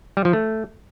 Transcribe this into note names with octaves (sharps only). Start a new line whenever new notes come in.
G3
F3
A3